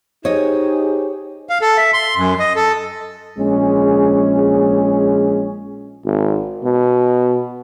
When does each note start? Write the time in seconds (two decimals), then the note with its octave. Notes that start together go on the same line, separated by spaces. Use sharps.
0.25 D#4 G4 G#4 C5 C#5 D#5
1.49 F5
1.61 A4
1.77 E5
1.94 C6
2.17 F#2
2.40 D#5
2.56 A4
3.39 A#1 G#3 C#4 G#4
6.05 G#1
6.64 B2